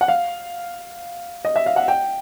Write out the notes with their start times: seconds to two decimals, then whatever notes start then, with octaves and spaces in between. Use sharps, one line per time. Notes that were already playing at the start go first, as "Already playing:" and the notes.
0.01 F#5
0.08 F5
1.45 D#5
1.56 E5
1.66 F5
1.76 F#5
1.88 G5